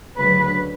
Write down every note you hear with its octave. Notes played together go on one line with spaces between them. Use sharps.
D2 C#3 F#3 B4